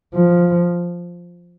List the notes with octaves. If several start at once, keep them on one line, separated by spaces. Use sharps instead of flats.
F3